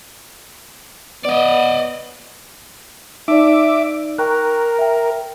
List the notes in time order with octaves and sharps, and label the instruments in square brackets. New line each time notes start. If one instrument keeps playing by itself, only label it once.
[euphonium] B3 [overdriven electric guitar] D5 D#5
[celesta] D#4 D5 [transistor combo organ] E5 D6
[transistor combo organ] A#4 [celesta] G5 C#6 F#6
[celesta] E5 G5